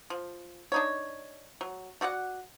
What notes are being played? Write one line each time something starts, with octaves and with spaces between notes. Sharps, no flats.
F3
D4 D#4 C#5
F#3
A3 F#4 D5 F#5